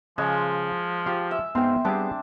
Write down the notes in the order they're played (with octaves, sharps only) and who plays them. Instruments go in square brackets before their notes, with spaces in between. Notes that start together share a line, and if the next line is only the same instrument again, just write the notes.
[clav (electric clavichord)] C#3 [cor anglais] F3 [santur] G#3
[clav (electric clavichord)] F4 G4 C5
[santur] E5
[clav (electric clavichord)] G#2 C4 F5 [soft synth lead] B3 [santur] G5 C6
[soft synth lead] G3 [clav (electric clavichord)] B3 G4 G#4 [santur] C4 D4 D6